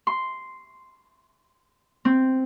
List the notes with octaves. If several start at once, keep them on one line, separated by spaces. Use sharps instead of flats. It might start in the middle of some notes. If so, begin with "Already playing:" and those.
C6
C4